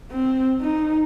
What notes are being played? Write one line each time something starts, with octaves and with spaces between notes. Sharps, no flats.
C4
D#4